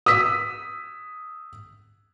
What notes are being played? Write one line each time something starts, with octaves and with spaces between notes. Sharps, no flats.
D#6 E6 B6